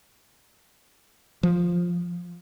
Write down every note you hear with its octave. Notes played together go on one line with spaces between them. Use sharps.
F3